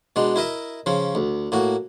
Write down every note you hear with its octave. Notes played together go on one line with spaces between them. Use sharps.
B2 G#3 D4
E4 A#4 D#5 E5
C#3 F3 C#4
D2
A2 A#3 F#4